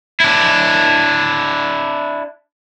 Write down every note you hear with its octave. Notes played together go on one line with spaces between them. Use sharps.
D4 E4